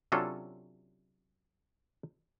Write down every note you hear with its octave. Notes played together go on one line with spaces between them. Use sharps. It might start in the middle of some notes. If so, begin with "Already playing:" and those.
C3 F#3 C#4 D4 F4 A4